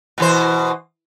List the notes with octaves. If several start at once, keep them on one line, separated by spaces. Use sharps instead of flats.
B2 E3 C5